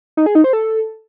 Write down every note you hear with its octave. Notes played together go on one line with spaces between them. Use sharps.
D#4
G#4
D#4
C5
A4